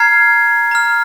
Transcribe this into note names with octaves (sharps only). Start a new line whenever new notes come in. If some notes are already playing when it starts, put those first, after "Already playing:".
Already playing: A#5 F6 G#6 C7
A#5 F6